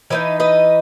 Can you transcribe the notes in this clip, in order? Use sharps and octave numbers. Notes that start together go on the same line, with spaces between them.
E3 B3 D#4 B4 D#5
B4 D#5